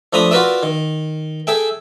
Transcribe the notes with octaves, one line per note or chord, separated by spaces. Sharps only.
F3 A3 D4 A#5 B5 D#6
F4 F#4 A#4 B4 D5 E5
D#3
G#4 A4 E5 G5